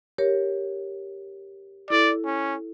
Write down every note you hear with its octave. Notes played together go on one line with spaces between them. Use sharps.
G4 A#4 C#5
E4 A4 D5
C#4